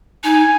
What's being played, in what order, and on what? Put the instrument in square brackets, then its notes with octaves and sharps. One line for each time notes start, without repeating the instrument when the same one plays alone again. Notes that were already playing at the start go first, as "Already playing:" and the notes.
[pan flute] D#4 [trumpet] G#5